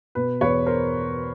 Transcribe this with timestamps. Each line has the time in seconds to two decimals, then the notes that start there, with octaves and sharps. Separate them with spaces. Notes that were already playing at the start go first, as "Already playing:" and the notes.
0.15 B2 B4
0.41 E2 B4 C#5
0.66 A#4 C5